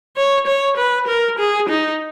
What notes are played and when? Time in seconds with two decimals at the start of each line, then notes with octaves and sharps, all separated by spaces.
0.17 C#5
0.47 C#5
0.77 B4
1.08 A#4
1.39 G#4
1.69 D#4